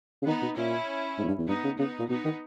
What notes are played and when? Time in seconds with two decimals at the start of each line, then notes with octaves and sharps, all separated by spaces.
0.22 C#3
0.26 D#3 B3 D#4
0.42 B2
0.57 A#2 C#4 E4
1.18 G#2
1.23 E2
1.28 G2
1.38 E2
1.48 G2 B3 D#4
1.64 C#3
1.79 C#3 B3 D#4
1.99 A#2
2.09 B2 B3 D#4
2.25 D#3